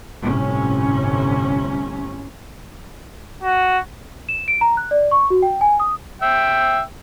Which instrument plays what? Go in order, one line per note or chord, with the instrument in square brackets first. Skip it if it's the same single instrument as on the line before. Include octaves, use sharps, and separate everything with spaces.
[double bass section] G1 A2 C3 C#4
[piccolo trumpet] F#4
[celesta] E7
D7
A#5
F#6
D5
C#6
F#4
G5
G#5
D#6
[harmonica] E5 G5